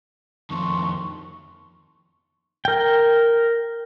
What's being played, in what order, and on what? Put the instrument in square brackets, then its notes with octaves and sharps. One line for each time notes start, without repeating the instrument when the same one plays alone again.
[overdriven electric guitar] F2 D#3 [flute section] C6 C#6
[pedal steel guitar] A#4 G5